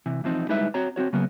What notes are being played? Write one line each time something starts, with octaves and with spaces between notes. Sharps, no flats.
C3 E3
E3 F3 C4 D#4
G3 G#3 D#4 E4 B4 E5
C4 F#4 C#5 A#5
C4 C#4 F#4 C#5
C#3 F#3 A#3 B3